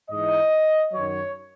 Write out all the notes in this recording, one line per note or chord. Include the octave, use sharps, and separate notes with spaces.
G#2 E3 D#5
F#2 D#3 F#3 C#5